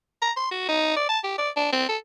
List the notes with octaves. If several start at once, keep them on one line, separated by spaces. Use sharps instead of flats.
A#5
C6
F#4
D#4
D5
A5
G4
D5
D4
C4
A4